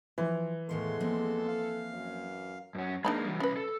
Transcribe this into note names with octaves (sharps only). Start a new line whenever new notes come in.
E3 F3
E2 A2 D#3 G#3 A4 F5 C6
F3 A#3 C4
F5
F#2
F#2 C#4
G#3 A#3 D4 D#4 B5
E3 G3
C2 C#4 B4 B5
A4